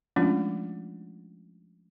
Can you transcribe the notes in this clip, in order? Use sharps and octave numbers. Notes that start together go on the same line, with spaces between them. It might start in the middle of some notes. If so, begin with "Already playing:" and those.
F3 G#3 A3 C#4 D4 F4